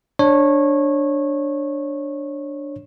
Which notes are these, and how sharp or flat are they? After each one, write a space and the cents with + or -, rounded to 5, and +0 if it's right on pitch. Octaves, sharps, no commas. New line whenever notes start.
D4 +0 C#5 -20